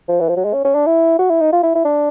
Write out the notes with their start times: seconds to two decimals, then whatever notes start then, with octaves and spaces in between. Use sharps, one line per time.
0.09 F3
0.20 E3
0.29 F3
0.37 F#3
0.45 G#3
0.54 C#4
0.65 C#4
0.75 D4
0.86 E4
1.19 F#4
1.30 E4
1.41 D#4
1.53 F4
1.63 E4
1.75 E4
1.85 D4